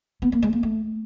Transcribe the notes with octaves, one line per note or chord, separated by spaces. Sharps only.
B3
A#3
G#3
A#3
A3